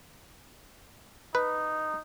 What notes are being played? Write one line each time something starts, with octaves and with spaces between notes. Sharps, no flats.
D#4 B4